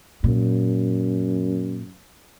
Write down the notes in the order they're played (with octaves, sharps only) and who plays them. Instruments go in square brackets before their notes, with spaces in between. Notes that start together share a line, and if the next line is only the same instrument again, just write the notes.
[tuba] F#2 [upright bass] A#2